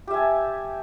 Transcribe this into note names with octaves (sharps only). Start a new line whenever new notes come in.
G4 E5 G#5 A5